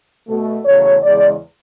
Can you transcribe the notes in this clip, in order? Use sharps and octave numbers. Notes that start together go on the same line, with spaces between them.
B2 A3
E2 C#3 F#3 A3 C#5
E2 C#3 G#3 D5